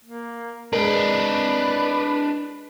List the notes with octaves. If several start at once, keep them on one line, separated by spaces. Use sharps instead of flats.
A#3
G#3 D4 A#4 B4 D#5